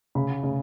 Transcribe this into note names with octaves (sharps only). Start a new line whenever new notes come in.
C#3 B5
C#3